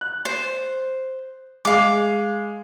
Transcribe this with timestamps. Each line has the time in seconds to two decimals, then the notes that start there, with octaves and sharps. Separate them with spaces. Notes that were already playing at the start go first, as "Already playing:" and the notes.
0.01 F#6
0.25 C5
1.65 G#3 F5 D6